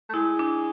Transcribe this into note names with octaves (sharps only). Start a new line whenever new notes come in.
A3
G#3 E4
D4